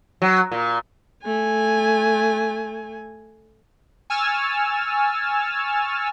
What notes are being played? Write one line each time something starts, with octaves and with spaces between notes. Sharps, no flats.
F#3
A#2
A3 G#5
G#5 C#6 E6 F6 A6